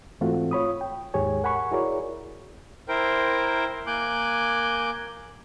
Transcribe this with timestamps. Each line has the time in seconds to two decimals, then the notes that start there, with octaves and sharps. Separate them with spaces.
0.21 G#2 E3 A3 C4 F4 F#4
0.51 F4 C#5 B5 D#6
0.81 G5
1.14 D#2 G#2 G4 G#4 C#5 G#5
1.43 A#4 F#5 G#5 B5 C#6
1.72 E4 F#4 G#4 A#4 C#5 D5
2.88 E4 A#4 C5 G5
3.87 A#3 G#5 D6 F#6 G6